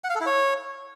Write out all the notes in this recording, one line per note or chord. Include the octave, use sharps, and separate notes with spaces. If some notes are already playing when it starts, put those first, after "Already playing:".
F#5
F5
A4
E4
C#5